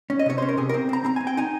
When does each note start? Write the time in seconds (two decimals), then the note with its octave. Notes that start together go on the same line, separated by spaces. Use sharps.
0.10 C#4
0.19 D#5
0.26 C3 C#5
0.38 C#4 C5
0.49 A#4
0.57 C3 G#4
0.69 A#4
0.74 C4
0.89 C4 A#5
1.05 C4 A#5
1.16 C4 G#5
1.27 G5
1.37 D#4 G#5